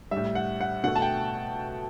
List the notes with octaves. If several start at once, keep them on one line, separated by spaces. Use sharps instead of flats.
A2 G3 E5
F#5
F#5
B2 A3 F#5
A5
G5